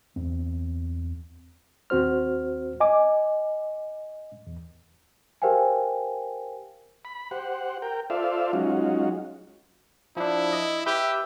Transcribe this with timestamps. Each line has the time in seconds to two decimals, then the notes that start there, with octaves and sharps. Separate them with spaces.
0.16 E2 C4
1.90 D#2 C4 F#4 C5 F6
2.80 D#5 G#5 D6
4.47 E2
5.42 G4 A#4 C5 F5 G5 G#5
7.05 B5
7.31 G4 C5 F#5
7.82 A#4 G5
8.10 F4 A4 C5 D5 E5 F5
8.53 F#3 G#3 C#4 D#4 F4 F#4
10.17 F3 D4 E4
10.53 D#5
10.86 G4 B4 E5 G6